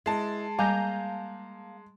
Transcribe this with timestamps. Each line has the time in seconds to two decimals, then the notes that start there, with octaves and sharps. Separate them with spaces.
0.06 G#3 E4 B4 D#5 A5
0.59 G3 A#3 F5 G#5 A#5 G6